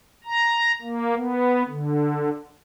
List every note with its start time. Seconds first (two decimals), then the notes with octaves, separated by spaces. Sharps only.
0.24 A#5
0.82 A#3
1.15 B3
1.68 D3